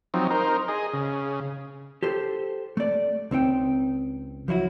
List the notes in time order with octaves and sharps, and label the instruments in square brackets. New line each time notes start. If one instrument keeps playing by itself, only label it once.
[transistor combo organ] F3 F#3 C4 D#4
D#4 A#4 C5
G#4 D#5
C#3
[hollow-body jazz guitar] G4 A4 C5
A3 D5
C#2 C4 D#4 G5
F3 F#3 E4 F#4